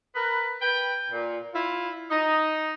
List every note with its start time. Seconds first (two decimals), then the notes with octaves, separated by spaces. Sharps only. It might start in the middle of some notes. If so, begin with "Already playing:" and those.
0.15 A#4 B4
0.61 B4 G5
1.11 A#2
1.53 E4 F4
2.10 D#4